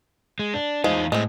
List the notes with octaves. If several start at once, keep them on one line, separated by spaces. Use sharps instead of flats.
G#3
D4
E2 F3 G#3 D#4 F5
A2 G#3 C4